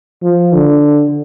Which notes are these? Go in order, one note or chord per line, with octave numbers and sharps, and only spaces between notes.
F3
D3